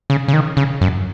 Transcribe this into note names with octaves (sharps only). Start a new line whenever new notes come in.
C#3
C#3
D#3
C#3
F#2